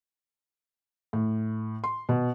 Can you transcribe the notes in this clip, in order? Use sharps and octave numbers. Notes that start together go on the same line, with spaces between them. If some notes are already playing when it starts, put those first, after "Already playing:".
A2
C6
B2